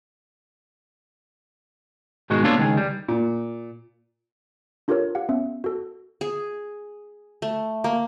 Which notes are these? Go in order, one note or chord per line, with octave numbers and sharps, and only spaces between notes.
G#2 B2 D#3 G#3 F#4
A#3 B3 D4 F4 A4 C#5
C#2 D#3 G#4
G3
A#2
D4 F4 G4 A4 A#4 C#5
G4 F5 F#5
B3 C#4 E5
F#4 A4
G#4
A3
A#3